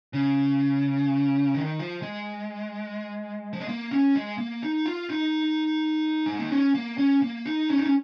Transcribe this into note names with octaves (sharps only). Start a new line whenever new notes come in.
C#3
D#3
F3
G#3
F3
G#3
A#3
C#4
G#3
A#3
D#4
F4
D#4
G#3
A#3
C#4
A#3
C#4
A#3
D#4
C#4
D#4
C#4